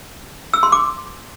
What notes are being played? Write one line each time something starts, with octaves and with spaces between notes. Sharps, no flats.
E6
C6
D6